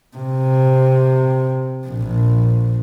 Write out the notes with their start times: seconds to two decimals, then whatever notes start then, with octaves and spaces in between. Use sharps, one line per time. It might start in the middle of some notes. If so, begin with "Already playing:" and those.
0.17 C3
1.87 A#1